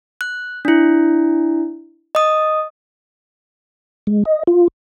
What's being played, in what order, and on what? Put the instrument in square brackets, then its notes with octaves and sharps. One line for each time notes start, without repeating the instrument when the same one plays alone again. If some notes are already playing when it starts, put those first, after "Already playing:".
[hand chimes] F#6
D4 E4
D#5 D#6
[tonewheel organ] G#3
D#5
F4